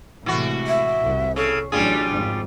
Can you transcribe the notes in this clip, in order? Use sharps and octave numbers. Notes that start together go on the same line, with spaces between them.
A2 C3 E3 G#3 F#4
E5
C2
C#3 A4
A1 F#3 G3 D4 F4 G#4
G#1 F2 G#2